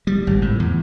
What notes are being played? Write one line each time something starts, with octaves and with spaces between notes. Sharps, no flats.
G3
G#1
A2
E2